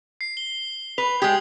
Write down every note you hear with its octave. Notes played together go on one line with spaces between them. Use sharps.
C7
G7
B4 F7
G#3 G4 D#6 G#6